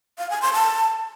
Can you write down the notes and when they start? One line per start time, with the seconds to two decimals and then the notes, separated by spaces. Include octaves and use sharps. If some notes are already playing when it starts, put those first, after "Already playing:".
0.18 F5
0.30 G#5
0.42 C6
0.54 A5